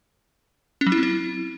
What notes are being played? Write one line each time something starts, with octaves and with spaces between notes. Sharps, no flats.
C#4
F#3
E4
C4
E4